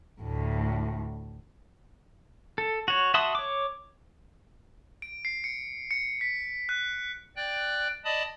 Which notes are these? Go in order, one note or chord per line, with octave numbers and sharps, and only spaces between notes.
D2 A2
A4
F#4 C#5
F#4 E5 A5 C6 D#6
C#5 D6
D7
C7
C#7
C#7
B6
F#6
D5 G5 F#6
D5 D#5 A5 B5 D#6